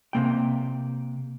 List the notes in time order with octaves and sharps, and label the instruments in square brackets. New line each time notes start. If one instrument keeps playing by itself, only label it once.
[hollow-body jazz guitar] C3 A#3 G5